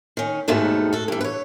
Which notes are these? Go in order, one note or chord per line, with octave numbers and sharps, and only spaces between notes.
D#3 C#4
D#2 G#2 B2 D#3 A3 B3
F#4 A4
G2 E3
B4 C#5